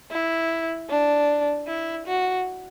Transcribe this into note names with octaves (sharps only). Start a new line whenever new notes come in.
E4
D4
E4
F#4